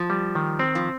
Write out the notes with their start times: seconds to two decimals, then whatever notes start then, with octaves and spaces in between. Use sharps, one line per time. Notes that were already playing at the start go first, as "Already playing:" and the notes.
Already playing: F3
0.10 G3
0.35 D#3
0.59 C4
0.75 F3